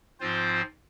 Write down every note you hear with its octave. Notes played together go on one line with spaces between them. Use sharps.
G#2 F3 C4 F4 C5